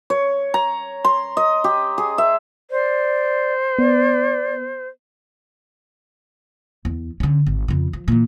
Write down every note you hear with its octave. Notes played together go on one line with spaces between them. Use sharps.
C#5
A#5
C6
D#5
G4
G#4
E5
C5 D5
B3 D5
E2
D3 C#4
G#1
F2 C#3
F3
A#2 E3